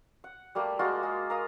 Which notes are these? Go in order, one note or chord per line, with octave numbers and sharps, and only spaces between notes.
F#5
G3 A3 A#3 G4
G#3 A#3 F4 F#4
G#3
A#4 F5 D#6